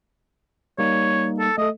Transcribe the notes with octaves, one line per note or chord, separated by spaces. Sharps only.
G3 A#3 D#4 C#5
A4
A3 A4 D#5